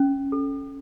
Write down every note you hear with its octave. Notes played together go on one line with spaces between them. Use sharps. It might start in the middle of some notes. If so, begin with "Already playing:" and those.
Already playing: C#4
A4